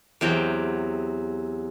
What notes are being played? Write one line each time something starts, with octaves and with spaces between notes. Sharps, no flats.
E2 C3 F#3 G5